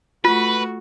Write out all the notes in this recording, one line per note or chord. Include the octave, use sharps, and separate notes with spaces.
A3 F4 F#4 B4